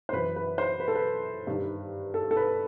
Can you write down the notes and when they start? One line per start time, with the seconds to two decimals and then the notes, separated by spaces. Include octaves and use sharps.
0.09 C5
0.13 F#2 E3 B4
0.36 B4
0.58 C5
0.80 B4
0.88 A4
0.95 B4
1.47 G2 D#3
2.14 A4
2.31 A4
2.37 B4